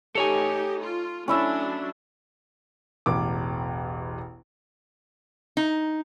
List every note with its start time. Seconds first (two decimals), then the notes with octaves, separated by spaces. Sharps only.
0.15 A3 D#4 G4 A4 C#5 G#5
0.81 F4
1.28 F#3 A3 C#4 D4 E4 E5
3.06 E1 A1 D6
5.57 D#4